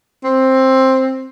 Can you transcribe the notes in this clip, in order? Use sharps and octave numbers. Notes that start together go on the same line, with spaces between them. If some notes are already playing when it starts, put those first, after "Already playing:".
C4